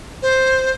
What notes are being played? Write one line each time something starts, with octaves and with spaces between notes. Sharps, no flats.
C5